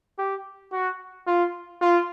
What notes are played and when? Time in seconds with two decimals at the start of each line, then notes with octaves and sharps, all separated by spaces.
0.19 G4
0.72 F#4
1.27 F4
1.81 F4